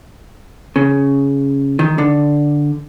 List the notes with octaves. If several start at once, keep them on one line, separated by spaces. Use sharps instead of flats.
C#3
D#3
D3